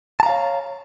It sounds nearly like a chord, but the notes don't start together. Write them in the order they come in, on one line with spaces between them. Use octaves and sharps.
A5 A#5 F5 C#5